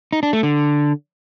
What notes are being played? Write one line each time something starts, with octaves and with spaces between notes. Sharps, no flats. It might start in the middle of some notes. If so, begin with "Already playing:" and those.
D#4
D4
A3
D3